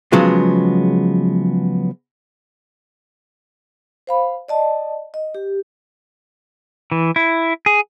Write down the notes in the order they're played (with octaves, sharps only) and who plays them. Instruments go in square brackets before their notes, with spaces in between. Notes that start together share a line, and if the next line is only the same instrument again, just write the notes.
[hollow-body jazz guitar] C#3 F3 F#3 G#3 B3
[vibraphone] C5 F5 B5
D5 D#5 A5
D#5
G4
[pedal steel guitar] E3
E4
G#4